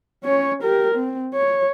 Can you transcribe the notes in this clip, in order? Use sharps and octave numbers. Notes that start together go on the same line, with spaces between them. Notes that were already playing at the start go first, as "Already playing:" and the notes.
C#4 C#5
G4 A#4
C4
C#5